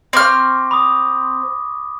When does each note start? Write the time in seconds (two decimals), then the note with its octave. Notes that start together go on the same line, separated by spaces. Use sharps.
0.13 C4 C#6 D6 F6 A#6
0.71 B5 D6 D#6